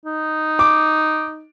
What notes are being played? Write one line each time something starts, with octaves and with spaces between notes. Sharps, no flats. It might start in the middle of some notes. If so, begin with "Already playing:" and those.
D#4
D6